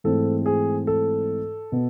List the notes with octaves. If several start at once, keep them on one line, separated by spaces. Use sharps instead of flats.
G#2 E3 A3 C4 A4
G#4
A4
B2 B3